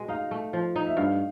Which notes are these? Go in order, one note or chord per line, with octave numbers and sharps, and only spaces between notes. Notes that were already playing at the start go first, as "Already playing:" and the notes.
Already playing: B2 G#3
D#4 F5
A3
F3
D#4
E5
G2 F5